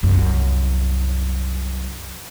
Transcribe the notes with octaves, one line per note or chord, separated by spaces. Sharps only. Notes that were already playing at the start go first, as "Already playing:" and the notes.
C2 F#2